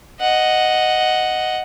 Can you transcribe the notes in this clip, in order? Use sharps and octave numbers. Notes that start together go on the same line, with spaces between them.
D#5 F#5